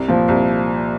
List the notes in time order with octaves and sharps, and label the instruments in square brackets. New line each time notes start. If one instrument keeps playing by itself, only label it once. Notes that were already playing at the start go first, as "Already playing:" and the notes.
Already playing: [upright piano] C2
A#2 F3
C2